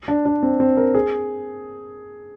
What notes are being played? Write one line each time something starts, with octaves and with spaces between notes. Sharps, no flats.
D4
D4
C4
C4
A#4
G#4